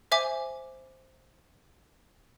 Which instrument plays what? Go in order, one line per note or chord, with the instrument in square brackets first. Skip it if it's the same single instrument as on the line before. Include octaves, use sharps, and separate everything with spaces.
[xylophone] C5 E5 G#5 D6